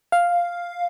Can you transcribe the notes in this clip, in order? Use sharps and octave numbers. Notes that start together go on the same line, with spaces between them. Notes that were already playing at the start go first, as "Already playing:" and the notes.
F5